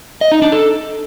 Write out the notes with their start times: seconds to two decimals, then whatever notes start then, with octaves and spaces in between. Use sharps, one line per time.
0.21 D#5
0.32 D#4
0.42 D4
0.52 A4